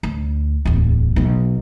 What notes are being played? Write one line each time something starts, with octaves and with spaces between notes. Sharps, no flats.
D2
D1 E2
B1 F#3